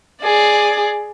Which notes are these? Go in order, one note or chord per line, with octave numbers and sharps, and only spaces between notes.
G#4 D5